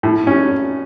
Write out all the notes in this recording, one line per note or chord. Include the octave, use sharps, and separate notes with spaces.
A2
C#4